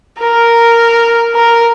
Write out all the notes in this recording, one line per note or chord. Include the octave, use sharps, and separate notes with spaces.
A#4
A#4